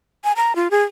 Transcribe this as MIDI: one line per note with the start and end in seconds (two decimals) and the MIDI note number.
0.24 0.32 80
0.36 0.55 82
0.56 0.68 65
0.71 0.83 68